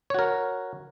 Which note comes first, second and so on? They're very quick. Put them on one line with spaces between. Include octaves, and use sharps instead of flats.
C#5 F#4 A#4